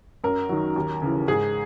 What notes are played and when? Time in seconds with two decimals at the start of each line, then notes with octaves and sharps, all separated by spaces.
0.24 F#2 A#4
0.49 D#3 F#3
0.76 D#2
1.02 C#3 E3
1.28 G#2 G#4